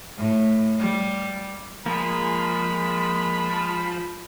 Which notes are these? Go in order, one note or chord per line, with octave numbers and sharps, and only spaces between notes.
A2
G3
F3 G#3 A#3 G#4 B5